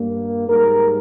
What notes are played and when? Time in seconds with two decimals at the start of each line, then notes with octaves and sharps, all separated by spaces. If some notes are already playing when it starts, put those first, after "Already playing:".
Already playing: G2 G3 A#3
0.48 G#2 G3 A#3 A#4